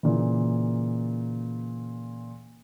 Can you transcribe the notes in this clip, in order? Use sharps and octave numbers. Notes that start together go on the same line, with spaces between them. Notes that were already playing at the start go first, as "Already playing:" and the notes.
A#2 C#3 E3